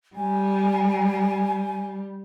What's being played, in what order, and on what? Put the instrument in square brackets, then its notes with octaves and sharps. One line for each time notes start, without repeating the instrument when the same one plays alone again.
[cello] G3 [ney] G#5